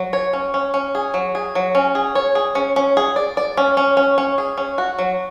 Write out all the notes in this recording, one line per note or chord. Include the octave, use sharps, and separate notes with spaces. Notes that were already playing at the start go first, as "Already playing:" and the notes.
Already playing: F#3
C#5
C#4
C#4
C#4
G#4
F#3
G#4
F#3
C#4
G#4
C#5
G#4
C#4
C#4
G#4
D5
D5
C#4
C#4
C#4
C#4
G#4
C#4
F#4
F#3